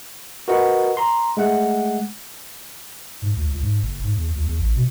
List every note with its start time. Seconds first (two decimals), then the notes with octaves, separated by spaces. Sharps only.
0.48 F#4 A#4 B4 D#5 F#5
0.97 A#5 C6
1.37 G#3 A3 F#5 F#6
3.22 G#2
3.36 D2
3.49 C#2
3.62 G#2
3.82 F#1
4.03 G#2
4.17 E2
4.34 D2
4.46 E2
4.59 A1
4.76 B2